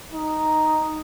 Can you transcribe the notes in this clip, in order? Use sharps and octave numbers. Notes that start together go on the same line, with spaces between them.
D#4